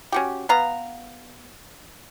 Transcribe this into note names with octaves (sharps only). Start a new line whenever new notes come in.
C#4 F#4 G4
B3 F5 A#5